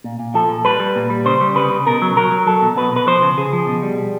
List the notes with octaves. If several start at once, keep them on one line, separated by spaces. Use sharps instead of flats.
A#2
A#2
F3 A4
A#2
G3 B4
G3
A#2
G3
C#3 C5
G3
C#3 B4
C#3
B2 A#4
F#3
F#3 A#4
F#3
F#3 A4
B2
B2 B4
B2 B4
F3 C5
C#3
C#3 G#4
F3
B2
G3
G3